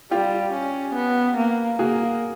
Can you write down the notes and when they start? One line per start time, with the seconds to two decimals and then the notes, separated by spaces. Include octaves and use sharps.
0.11 G3 F4 G4
0.53 C#4
0.95 B3
1.37 A#3
1.79 A#3 F#4 G#4